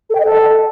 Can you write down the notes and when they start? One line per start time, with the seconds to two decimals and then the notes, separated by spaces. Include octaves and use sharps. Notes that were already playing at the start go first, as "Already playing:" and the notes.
0.09 A4
0.15 G5
0.20 D#5
0.25 A4